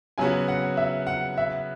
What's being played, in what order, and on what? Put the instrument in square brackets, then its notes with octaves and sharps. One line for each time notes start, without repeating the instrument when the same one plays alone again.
[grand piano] C#3 F#3 B3 F#4 [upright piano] G#5
[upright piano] F#5
E5
F#5
E5